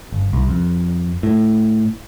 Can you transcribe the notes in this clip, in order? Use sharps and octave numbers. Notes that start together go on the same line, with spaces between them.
G1
C2
F2
A2